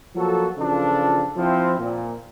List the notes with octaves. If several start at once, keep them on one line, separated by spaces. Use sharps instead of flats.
F3 F#3 A#3 F#4 A4
C#3 E3 F3 D4 F4 A4
F3 C4 E4
A#2